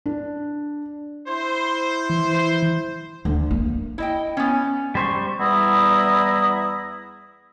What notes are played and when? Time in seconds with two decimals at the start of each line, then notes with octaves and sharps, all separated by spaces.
0.06 D4
1.28 E4 C5
2.09 E3
3.25 D2
3.51 A#3
3.98 E4 D#5 G5
4.37 B3 C#4
4.95 G3 C5 C#6
5.40 E2 G3 B3 E4 A#5 D#6